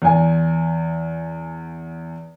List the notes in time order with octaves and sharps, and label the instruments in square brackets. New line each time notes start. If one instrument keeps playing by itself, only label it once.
[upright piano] E2 G#5